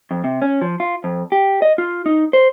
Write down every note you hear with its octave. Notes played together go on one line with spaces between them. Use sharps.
F2
C3
C#4
F3
F4
F2
G4
D#5
F4
D#4
C5